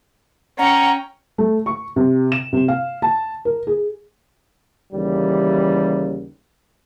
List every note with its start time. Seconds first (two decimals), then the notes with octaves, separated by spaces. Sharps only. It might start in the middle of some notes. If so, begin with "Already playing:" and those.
0.59 C#4 F#5 G5 A#5
1.38 A3
1.66 C#6
1.96 C3
2.32 E7
2.53 C3
2.68 F5
3.02 A5
3.45 A#4
3.67 G#4
4.93 D#2 C#3 E3 G3